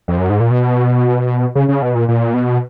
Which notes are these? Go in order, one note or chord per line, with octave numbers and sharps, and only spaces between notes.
F2
F#2
G#2
A#2
B2
C#3
C#3
B2
A#2
A#2
B2